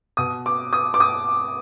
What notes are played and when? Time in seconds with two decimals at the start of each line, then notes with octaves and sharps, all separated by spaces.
0.17 B2 D#6
0.46 D6
0.73 D#6
0.94 D6
1.00 D#6